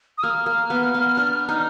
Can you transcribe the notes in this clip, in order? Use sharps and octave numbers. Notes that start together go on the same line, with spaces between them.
D#6
A#3 F6
A#3
B3
B3
D4
D#4